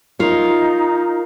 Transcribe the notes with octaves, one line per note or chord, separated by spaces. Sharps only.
D#4 F4 A#4 C#5